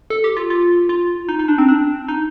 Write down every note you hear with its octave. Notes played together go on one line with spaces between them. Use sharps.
A4
G4
F4
F4
F4
D#4
D#4
D4
C4
D4
D#4